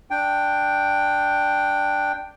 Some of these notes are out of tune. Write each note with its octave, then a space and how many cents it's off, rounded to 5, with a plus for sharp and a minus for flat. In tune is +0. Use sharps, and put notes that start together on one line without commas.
D4 +0 G5 +0